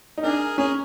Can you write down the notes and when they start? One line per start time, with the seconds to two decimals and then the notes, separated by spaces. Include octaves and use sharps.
0.17 D#4
0.23 D4 G#4 A#4
0.58 C#4 G#4 A#4